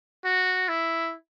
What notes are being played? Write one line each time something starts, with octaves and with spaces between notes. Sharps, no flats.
F#4
E4